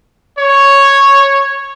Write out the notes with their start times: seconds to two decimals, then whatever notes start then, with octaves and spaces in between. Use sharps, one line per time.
0.38 C#5